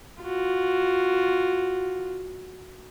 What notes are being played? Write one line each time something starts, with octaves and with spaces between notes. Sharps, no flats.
F4 F#4